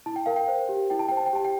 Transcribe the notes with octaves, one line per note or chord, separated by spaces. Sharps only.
E4 A5
G5
A#4 F5
G5
C5
G4
E4 G5
A5
C5 G5
A5
G5
G4 A5
G5